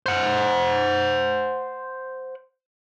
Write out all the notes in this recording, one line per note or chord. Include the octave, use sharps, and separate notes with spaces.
C5 F#5